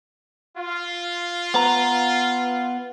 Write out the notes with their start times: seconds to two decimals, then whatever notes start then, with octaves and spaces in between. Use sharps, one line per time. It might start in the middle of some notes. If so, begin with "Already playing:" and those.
0.58 F4
1.54 B3 B4 A#5